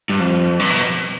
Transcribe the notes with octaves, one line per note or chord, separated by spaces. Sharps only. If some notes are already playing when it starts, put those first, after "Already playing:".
G2
F2
G2
B2